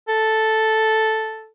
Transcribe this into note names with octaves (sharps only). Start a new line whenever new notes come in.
A4